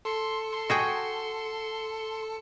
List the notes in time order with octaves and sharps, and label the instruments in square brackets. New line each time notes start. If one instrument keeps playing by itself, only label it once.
[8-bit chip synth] A4 C#7 [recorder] C6
[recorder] C6
[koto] F#4 G#4 G5